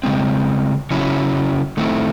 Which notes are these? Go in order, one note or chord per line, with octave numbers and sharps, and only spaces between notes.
C#3 G#3 C4
C#3 F#3 C#4 E4
D#3 A3 C4 E4